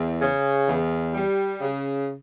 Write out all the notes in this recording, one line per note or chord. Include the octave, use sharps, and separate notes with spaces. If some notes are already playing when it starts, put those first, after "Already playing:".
Already playing: E2
C#3
E2
G3
C#3